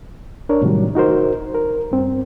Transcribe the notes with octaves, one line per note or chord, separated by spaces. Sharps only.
D4 A#4 C#5
A2 C3 D#3 F#3 G3
D#4 F#4 A#4 C5
A#4
G2 C4